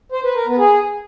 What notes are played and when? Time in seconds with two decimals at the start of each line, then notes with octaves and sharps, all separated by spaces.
0.12 C5
0.24 B4
0.35 A#4
0.47 B3
0.59 G#4